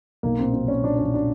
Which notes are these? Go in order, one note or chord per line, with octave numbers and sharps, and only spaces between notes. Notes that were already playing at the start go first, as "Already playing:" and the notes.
B1 A#3
A#2 C4
C4
B1 C#4
A#2 D4
C#4
B1
D4